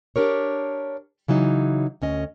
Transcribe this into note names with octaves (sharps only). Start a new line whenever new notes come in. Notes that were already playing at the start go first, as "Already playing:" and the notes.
D4 G4 A#4 C#5
C#3 E3 F#3 D#4
D2 C#4 D#5